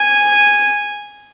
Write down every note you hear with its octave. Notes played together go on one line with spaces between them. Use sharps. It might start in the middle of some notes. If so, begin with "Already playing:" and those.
Already playing: G#5